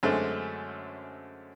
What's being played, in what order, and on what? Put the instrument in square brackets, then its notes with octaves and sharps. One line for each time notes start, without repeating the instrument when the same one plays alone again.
[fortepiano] F#2 D3 G#3 A3 C4